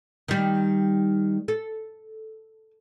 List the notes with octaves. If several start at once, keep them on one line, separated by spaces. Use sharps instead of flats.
D#3 G3
A4